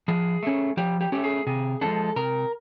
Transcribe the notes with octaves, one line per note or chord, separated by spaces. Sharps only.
F3 G#4
A3 C#4
F3 G4
G4
A3 C#4 G4
G#4
C3 G#4
F3 G#3 B3 D4 A4
C3 A#4